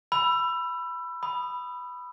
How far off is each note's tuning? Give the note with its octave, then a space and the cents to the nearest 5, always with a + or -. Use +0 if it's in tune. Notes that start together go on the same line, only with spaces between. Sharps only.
B5 +0 E6 +25
B5 +0 D#6 +0